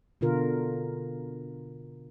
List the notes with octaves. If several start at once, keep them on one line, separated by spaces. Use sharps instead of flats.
B2 D3 F4 A#4